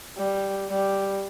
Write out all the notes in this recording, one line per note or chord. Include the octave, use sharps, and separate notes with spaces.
G3
G3